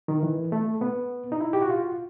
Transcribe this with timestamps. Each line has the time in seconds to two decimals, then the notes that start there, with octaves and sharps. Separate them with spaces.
0.08 D#3
0.23 E3
0.52 A3
0.81 B3
1.32 D#4
1.40 E4
1.53 G4
1.62 F#4
1.70 F4